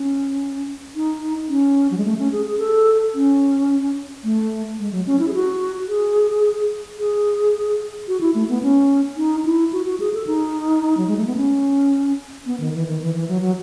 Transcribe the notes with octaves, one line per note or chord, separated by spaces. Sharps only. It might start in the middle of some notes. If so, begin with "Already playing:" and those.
Already playing: C#4
D#4
C#4
F#3
G#3
A3
C#4
G#4
G#4
A4
C#4
A3
G#3
F#3
C#4
E4
G#4
F#4
G#4
G#4
F#4
E4
A3
B3
C#4
D#4
E4
F#4
F#4
G#4
A4
D#4
F#3
G#3
A3
B3
C#4
B3
D#3
E3
D#3
E3
E3
F#3
F#3